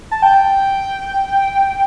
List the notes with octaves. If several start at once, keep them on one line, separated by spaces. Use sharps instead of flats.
A5
G5